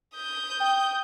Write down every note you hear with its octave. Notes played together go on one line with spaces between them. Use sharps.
D#6 G6
G5